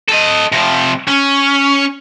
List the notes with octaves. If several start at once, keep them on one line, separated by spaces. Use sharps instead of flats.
A4 D#5
C3 F3
C#4